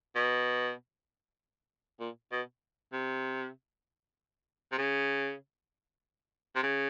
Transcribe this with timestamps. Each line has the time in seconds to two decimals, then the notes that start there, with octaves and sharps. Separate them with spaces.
0.16 B2
2.00 A#2
2.32 B2
2.93 C3
4.72 C3
4.78 C#3
6.56 C3
6.63 C#3